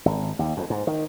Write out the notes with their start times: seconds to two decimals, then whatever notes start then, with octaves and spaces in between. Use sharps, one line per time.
0.06 G#1
0.39 D#2
0.57 F2
0.70 G#2
0.87 D#3